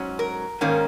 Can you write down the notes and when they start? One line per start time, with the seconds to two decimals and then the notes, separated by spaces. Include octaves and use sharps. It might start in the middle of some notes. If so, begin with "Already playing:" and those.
Already playing: G#2 F#3 C#4
0.19 A#4
0.61 G#2 D#3 A#3 C#4